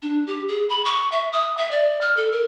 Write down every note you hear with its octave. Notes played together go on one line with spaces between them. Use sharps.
D4
G4
G#4
B5
C#6
E5
D#6
E5
D5
F6
A4
A#4